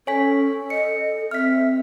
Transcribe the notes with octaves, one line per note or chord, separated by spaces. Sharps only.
C#4 A4 C#5 G#5 B6
D#5 C#7
C4 E5 F6 B6